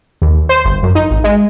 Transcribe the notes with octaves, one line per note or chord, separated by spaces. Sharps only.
D#2
C5
G1
F#2
D#4
G#1
G#3